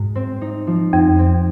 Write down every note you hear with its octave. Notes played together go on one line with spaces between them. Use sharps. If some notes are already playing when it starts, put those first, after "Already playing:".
Already playing: G#2 G#3
C4
D#4
F3
F2 C4
C4